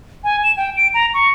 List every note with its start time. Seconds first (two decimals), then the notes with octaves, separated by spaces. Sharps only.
0.24 G#5
0.44 E7
0.57 G5
0.77 D7
0.94 A#5
1.14 C#6